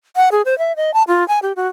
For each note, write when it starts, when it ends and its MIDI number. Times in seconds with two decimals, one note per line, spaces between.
0.16 0.29 78
0.32 0.42 68
0.45 0.57 72
0.58 0.75 76
0.76 0.93 75
0.94 1.03 81
1.08 1.26 65
1.28 1.39 80
1.42 1.53 67
1.56 1.67 66